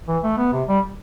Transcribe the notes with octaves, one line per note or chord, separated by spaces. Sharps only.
E3
A3
B3
C3
G3